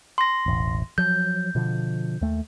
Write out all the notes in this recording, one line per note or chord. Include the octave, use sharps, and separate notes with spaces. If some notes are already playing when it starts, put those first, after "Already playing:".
C6 A#6
E1 A1
F3 F#3 G6
B2 D3 F3
D#2 A3